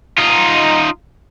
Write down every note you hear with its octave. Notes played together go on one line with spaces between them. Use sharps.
D#4 F4